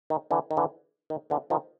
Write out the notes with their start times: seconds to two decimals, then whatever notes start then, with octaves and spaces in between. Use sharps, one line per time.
0.10 D#3
0.31 D3 E3
0.51 D#3
0.57 D3 E3
1.10 D#3
1.30 D3 E3
1.50 D#3 F3